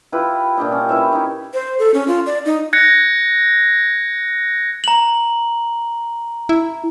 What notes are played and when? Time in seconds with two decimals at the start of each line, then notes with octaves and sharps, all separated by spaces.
0.12 E4 F4 G4 B4
0.57 A#2 D4 G4 D#5
0.72 C#4
0.89 E4 B4 C#5 E5
1.13 D#4 E4
1.54 C5
1.79 A4
1.94 C#4
2.08 F4
2.26 D5
2.45 D#4
2.73 F#6 G#6 A#6 C#7
4.84 A#5 F#7
6.49 E4